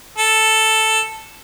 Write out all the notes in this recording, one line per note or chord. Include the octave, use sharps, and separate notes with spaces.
A4